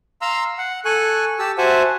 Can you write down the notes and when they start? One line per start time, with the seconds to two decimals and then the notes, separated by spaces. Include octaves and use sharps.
0.22 F5 A#5 C6 E6
0.58 F#5
0.85 A4 G#5 C#6 F#6
1.39 G4 A5 E6
1.58 F#4 C5 E5 F#5 G#5 A5